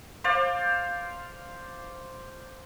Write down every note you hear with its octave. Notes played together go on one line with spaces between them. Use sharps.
C5 D5 F5